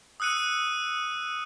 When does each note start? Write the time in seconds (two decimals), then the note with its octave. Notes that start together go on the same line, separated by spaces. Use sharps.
0.20 D#6 E6 F#6 C#7 D#7